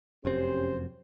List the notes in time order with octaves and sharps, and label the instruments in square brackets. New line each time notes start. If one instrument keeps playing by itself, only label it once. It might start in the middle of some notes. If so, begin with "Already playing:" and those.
[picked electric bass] F1 F#2 C4 [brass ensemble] C#4 G4 C5